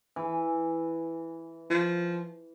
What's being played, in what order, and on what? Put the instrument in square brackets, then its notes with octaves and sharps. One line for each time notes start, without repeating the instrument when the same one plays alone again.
[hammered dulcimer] E3
[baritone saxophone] F3